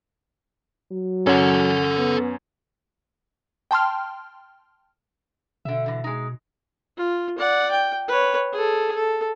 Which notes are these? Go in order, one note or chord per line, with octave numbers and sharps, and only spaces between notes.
F#3
F#2 C#4 A4 C#5 F#5
B3
G5 A5 C6 F6
B2 D3 E5
D3 E3
G#3 D#4
F4
D5 F#5
G5
B4 C#5
G#4 A4
A4